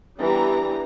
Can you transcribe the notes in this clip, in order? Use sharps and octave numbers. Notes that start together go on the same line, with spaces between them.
E3 G3 B3 D4 G4 A#5